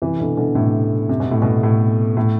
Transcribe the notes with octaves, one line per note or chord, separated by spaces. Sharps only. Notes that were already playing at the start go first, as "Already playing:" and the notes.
C3 E3
B2 D3
B2 D3
A2 C3
C3
B2
A2
B2
A2
A2